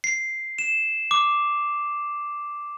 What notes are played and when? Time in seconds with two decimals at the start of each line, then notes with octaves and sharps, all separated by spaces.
0.04 C7
0.59 E7
1.11 D6